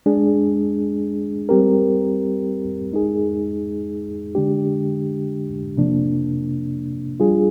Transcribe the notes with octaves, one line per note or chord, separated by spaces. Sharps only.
G#3 D4 G#4
G3 C4 G4 A#4
G#3 D#4 G#4
D3 G#3 D4 G4
C3 F3 A#3 D4
G3 D4 F4 G#4